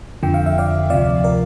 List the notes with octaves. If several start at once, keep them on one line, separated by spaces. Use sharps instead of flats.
F2 D3 F3 G5
F5
E5
D5 F5
D2 C3 F3 D5 F5
A#4 D5